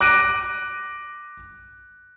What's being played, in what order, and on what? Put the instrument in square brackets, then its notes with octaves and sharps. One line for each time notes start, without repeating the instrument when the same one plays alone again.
[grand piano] D6 F#6 A#6 D7 D#7